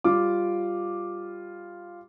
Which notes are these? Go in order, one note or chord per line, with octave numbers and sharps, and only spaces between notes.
G3 F4 D6